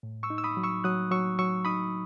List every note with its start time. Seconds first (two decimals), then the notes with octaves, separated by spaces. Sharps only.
0.03 A2
0.23 C#6 E6
0.30 D#4
0.38 E6
0.44 B5 D#6
0.57 F#3
0.64 C#6 E6
0.84 F#3 D#6 F#6
1.11 F#3 C#6 E6
1.39 F#3 C#6 E6
1.65 D#4 B5 D#6